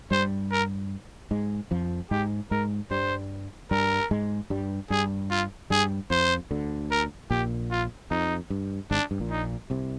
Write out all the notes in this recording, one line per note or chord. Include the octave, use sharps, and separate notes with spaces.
G2 G3 C5
A#4
G#2 G#3
F2 F3
G#2 G#3 G4
G#2 G#3 A#4
G2 G3 C5
G2 G3 A#4
G#2 G#3
G2 G3
G2 G3 G#4
F4
G2 G3 G#4
F2 F3 C5
D2 D3
A#4
A#1 A#2 G4
F4
F2 D#4
G2
G#1 G#2 D4
G2
A#1 A#2
D#4
C2 C3